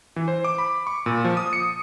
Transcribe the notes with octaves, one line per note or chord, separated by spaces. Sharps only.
E3
C5
D6
B5
C#6
A#2
F3
D#6
C#7